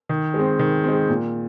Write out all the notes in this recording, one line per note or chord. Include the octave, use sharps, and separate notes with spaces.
D#3
G#3
C4
D#3
G#3 C4
A#2